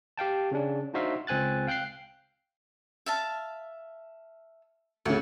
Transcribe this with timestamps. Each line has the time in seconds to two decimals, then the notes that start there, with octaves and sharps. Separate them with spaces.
0.18 G4 F5 G5 A5
0.52 C#3 C#4 D4
0.94 D4 D#4 F#4 C5 E5 F5
1.27 C#2 C4 G#5 F#6 A6
1.67 F5 G5 F#6 G6 C7
3.06 E5 F5 A5
5.06 D2 C#3 F#5